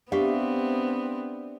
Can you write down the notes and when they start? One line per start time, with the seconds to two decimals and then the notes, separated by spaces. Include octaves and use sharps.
0.12 B3 C4 D4 G4 E5 F5 C#6